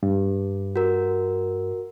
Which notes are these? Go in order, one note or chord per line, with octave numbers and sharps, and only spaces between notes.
G2
F#4 A#4